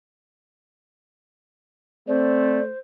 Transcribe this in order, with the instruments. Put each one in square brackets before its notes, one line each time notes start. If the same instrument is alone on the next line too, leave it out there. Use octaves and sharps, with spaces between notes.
[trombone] A3 [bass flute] C4 [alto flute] C5 [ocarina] D5